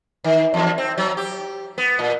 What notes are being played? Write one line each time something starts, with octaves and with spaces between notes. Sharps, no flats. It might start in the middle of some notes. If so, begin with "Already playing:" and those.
D#3
E2
C4
F#3
G4
B3
A#2